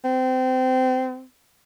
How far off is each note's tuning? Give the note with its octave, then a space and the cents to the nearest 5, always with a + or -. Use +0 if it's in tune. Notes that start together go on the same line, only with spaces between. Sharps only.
C4 -25